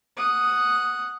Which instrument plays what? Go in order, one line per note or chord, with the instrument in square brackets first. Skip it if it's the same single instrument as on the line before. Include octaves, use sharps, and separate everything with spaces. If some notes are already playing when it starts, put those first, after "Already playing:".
[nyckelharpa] F#5 D#6